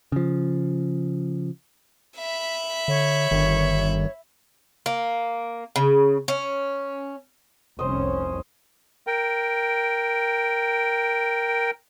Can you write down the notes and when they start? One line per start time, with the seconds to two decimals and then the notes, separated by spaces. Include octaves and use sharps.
0.12 C#3 F3
2.17 E5 B5
2.88 D3 C#5
3.31 G1 D#3
4.86 A#3
5.76 C#3
6.28 C#4
7.79 F1 C2 C#4 C5 D#5
9.07 A#4 G5